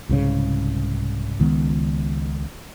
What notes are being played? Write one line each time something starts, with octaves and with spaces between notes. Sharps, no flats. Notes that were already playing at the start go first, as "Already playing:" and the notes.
C2 G#2 C#3
C#2 D#3 G#3 B3